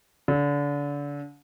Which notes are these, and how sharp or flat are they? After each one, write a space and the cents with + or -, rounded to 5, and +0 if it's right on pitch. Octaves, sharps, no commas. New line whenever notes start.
D3 -30